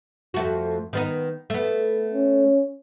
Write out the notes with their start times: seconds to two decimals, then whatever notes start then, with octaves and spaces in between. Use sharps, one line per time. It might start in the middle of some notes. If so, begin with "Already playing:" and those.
0.34 F2 A3 F#4
0.93 D#3 B3 D#4
1.50 A3 B3
2.14 C#4